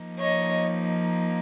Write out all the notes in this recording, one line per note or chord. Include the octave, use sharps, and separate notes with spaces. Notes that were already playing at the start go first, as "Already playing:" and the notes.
Already playing: F3 A#3 D#4
C#5 D#5